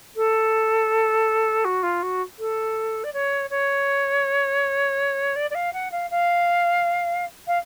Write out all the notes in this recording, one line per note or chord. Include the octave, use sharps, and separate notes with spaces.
A4
F#4
F4
F#4
A4
D5
C#5
C#5
D5
D5
F5
F#5
F5
F5
F5